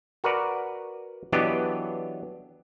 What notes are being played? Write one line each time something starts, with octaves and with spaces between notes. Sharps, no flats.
F#4 A#4 B4 D5
E3 F#3 B3 D4 G4 D#5